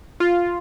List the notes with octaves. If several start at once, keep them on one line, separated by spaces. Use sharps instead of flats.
F4